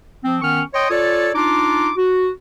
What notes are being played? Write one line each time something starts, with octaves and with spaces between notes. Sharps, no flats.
F3 C4
D#3 B3 C#4 C#6 F6
C#5 D#5 G5 C6 D#6
F4 A4 C#5 D5
D4 D#4 F4 D6
F#4